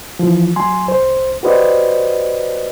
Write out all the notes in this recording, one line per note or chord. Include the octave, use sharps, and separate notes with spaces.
E3 F3
F#3 G#5 C6
C2 C5
F#4 G4 B4 C5 D5 D#5